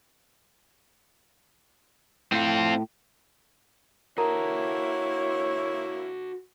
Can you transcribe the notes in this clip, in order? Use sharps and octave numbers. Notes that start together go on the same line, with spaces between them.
A2 C4 F4
A#3 E4 F#4 A4 A#4 C#5 A#5